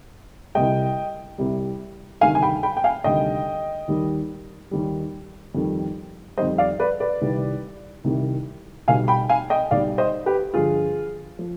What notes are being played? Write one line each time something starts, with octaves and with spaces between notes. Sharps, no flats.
C2 C3 G3 D#5 G5
C2 C3 G3
D2 C3 D#3 G3 F5 G#5
G#5
G5 B5
G5 B5
G5
F5 G#5
D2 C3 D#3 G3 D#5 G5
D#2 D#3 G3
D#2 D#3 G3
F2 D#3 G3
F2 D#3 G3 C5 D#5
D5 F5
B4 D5
B4 D5
C2 C3 D#3 G3
C2 C3 D#3 G3
B1 B2 G3 F5 G#5
G5 B5
F5 G#5
D#5 G5
B1 B2 G3 D5 F5
C5 D#5
G4 B4
G1 G2 F3 F4 G#4
F3